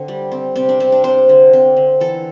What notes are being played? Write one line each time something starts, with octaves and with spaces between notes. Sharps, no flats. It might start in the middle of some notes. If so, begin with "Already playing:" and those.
Already playing: D3 C4
G3
C4
C3 C4
D4
C3 C4
D4
C4 C5
D3
C4
D3
E3 A4